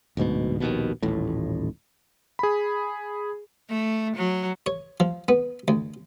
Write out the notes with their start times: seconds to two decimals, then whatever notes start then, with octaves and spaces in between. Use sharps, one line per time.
0.17 D1 D2 G#2 B2
0.60 A#1 D#2 B2
1.03 D#1 A1 A2
2.39 G#4 B5
3.69 A3
4.16 F#3
4.66 C#5
5.00 F3
5.28 B3
5.68 D2